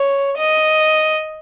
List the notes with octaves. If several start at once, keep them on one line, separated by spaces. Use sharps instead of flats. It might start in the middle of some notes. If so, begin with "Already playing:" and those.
Already playing: C#5
D#5